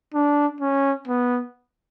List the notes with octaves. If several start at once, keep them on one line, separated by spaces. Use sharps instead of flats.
D4
C#4
B3